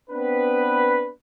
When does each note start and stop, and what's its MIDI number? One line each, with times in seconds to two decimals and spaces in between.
0.10 1.11 59
0.10 1.11 60
0.10 1.11 62
0.10 1.11 71